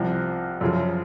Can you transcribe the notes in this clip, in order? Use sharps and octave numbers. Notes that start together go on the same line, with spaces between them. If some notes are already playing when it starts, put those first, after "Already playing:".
Already playing: C2 C3 F3
F#2 C#3 F3